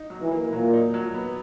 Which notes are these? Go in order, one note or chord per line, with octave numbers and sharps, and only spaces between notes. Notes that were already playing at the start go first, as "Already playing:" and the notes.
Already playing: D#4
F#3
E3
A#3
A#2 F#3
D#4
F#3
B3